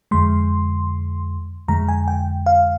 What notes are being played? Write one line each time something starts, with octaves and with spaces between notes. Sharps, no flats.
F2 D3 G#3 C6
F2 D3 G#3 A#5
G#5
G5
F5